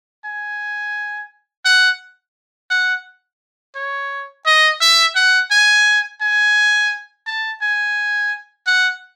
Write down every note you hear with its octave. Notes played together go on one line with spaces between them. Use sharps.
G#5
F#5
F#5
C#5
D#5
E5
F#5
G#5
G#5
A5
G#5
F#5